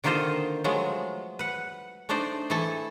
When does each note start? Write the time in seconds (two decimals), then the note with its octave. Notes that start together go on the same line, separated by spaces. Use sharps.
0.04 D3 D#3 A#3 F4 C5 D#5
0.64 F3 F#3 G#3 A3 B3
1.39 B4 F#5
2.09 A3 D4 D#4 C5 D5
2.50 E3 A3 E4 A4 A5